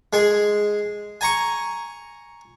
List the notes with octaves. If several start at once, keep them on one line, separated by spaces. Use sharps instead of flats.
G#3 G#4
G#5 A#5 C#6